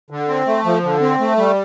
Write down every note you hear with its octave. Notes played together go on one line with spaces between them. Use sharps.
D3
C4
A3
F3
D3
C4
A3
G3